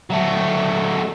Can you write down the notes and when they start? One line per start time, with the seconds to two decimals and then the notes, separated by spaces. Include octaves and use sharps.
0.10 F#3 A3